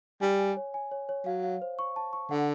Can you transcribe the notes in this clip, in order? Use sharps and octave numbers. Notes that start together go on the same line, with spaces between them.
G3 G#5
G#5
C#5
G#5
C#5
C#5
F#3 F5
F5
C5
C#6
A5
C#6
D3 F#5